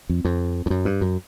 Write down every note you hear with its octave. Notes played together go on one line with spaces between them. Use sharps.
F2
F2
F2
F#2
G2
F#2